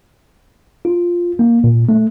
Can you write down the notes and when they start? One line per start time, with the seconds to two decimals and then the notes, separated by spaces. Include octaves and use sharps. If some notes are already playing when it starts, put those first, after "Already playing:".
0.85 F4
1.39 A#3
1.64 A#2
1.89 A3